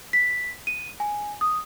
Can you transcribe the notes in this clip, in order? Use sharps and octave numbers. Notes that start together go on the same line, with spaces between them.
B6
D#7
G#5
D#6